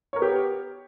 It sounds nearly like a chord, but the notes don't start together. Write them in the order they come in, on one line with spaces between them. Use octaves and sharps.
C#5 A#4 B3 G4